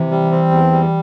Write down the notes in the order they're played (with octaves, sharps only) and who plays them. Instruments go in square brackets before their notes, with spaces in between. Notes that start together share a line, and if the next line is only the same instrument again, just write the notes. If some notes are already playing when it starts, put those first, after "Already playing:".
Already playing: [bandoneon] C3 [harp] E3
[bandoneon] G3
C4
E2
G3